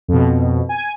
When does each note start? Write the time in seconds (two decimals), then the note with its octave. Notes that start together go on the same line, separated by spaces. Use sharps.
0.08 F2 B2
0.69 G#5